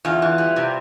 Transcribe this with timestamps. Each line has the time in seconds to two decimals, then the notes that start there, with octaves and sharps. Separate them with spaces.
0.05 E2 F4
0.22 E3
0.38 G3
0.56 C3